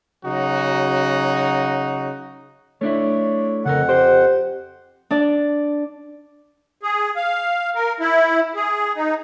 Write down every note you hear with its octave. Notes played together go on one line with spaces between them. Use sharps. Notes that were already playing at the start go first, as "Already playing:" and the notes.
C#3 F#3 D#4 F#4
A3 D4 E4 C#5
F2 C#3 A4 A#4 F#5
G4 C5
D4 D5
G#4
F5
A#4
E4
G#4
D#4